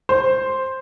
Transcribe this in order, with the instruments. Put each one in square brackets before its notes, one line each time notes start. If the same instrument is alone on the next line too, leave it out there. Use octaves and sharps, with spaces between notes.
[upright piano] C5